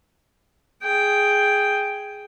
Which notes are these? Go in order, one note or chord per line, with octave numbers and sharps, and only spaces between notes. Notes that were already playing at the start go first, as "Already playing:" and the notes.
G#4 G5